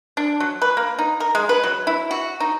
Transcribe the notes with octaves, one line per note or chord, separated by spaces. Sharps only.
D4
F#3
B4
A#3
D#4
A#4
G#3
B4
F#3
E4
F#4
D#4